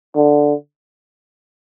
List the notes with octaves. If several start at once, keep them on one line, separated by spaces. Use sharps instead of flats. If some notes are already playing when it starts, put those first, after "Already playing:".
D3